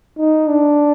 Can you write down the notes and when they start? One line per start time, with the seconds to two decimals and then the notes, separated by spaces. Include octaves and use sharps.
0.18 D#4
0.48 D4